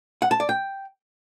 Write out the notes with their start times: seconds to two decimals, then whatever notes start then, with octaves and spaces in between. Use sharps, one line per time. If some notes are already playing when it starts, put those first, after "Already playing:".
0.22 F#5
0.31 A5
0.40 D5
0.49 G5